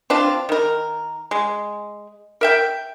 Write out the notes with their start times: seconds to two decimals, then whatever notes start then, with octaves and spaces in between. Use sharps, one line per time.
0.10 C4 D4 F4
0.49 D#3 A#4
1.31 G#3
2.41 A#4 E5 G5